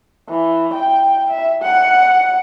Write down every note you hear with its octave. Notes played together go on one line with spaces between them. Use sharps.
E3
G5
E5
F#5